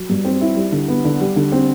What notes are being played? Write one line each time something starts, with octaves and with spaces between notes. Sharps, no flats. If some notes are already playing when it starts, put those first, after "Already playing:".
Already playing: F#3
G2
C4
E4
G3
D3
B3
D3
G3
D3
C4